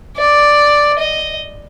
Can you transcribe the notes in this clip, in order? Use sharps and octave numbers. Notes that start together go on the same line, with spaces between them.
D5
D#5